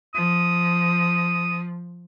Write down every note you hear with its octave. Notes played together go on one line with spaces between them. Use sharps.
F3 D#6